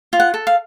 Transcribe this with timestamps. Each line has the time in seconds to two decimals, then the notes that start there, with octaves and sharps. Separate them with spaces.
0.13 F4
0.20 F#5
0.34 A4
0.47 F5